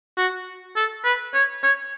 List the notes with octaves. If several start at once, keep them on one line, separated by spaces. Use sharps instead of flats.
F#4
A4
B4
C#5
C#5